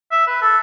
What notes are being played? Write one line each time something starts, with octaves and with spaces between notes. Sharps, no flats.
E5
B4
A4